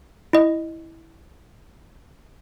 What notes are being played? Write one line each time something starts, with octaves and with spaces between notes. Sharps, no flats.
E4 D#5